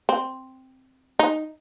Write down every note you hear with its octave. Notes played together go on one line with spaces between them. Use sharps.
C4
D#4